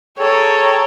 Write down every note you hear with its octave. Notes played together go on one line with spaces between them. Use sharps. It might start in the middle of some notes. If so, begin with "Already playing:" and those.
G#4 A4 C#5 G5 A#5